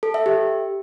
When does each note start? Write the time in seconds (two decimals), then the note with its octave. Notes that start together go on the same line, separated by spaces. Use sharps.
0.03 A4
0.14 E5
0.26 G4